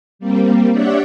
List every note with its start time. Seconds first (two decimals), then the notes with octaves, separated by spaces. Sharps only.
0.19 G3 A#3 C4
0.71 D4 G4 C#5 D5 E5 F#5